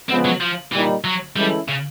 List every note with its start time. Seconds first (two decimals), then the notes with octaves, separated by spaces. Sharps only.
0.09 C#3 F3 G#3 B3 C4
0.25 F#3
0.40 F3
0.72 A#2 E3 G3 A#3 D#4
1.04 F#3
1.36 E3 G3 G#3 C#4 E4 A4
1.68 C#3